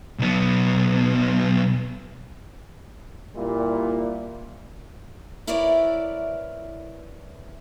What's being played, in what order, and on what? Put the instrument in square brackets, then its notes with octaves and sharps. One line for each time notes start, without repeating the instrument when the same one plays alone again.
[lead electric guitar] B1 B3
[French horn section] A#2 G3 E4
[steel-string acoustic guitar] E4 A#4 B4 C#5 D5 E5